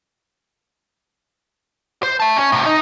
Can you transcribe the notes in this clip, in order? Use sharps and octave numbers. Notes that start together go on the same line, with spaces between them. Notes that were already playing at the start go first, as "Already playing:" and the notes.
C5
E5 A5
C#4
A2 C3
D#4